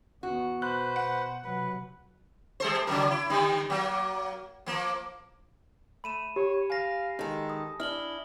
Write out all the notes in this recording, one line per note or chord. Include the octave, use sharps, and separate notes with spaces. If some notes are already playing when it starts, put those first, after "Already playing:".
E2 B3 F#4
B2 B4 C5 F#6
F#5
C3 F#3 B4
G3 A4 C5
C#3 F#3 A#4
E4
D3 D#3 G3
F#3 A#3
F3 A#3
A3 B5 D#7 E7
G4 C#5
F5 G#5 A#6
D#3 G#3 A4
D#6
D4 E4 F6 F#7 G7